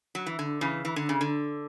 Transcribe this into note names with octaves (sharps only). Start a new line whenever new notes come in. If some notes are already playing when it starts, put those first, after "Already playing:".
F#3
E3
D3
C#3 E3
E3
D3
C#3
D3